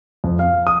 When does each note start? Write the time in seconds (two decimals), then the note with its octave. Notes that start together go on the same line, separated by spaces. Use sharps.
0.24 F2
0.39 F5
0.67 D#6